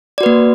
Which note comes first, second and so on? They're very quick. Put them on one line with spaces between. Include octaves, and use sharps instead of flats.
D5 F#4 B4 A#3